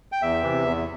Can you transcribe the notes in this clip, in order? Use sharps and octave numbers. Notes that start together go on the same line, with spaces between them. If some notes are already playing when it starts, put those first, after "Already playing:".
G5
E2 E5
C3 E3
E2